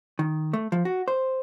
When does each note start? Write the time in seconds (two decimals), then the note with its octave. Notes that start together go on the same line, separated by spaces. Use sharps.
0.19 D#3
0.53 A3
0.72 F3
0.85 F#4
1.08 C5